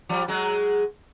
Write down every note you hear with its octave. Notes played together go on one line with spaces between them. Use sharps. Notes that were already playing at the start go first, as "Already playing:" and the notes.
F3 G3
F#3 G#3